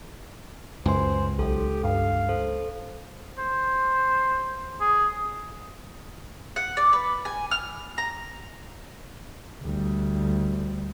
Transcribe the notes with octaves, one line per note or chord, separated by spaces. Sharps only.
C#2 F#2 B4 C5 G#5 C6
B1 G4 A4
G2 F5
A4 C5
C5
G#4
F#5
D5
B4
G#5
F6
A#5
D2 G3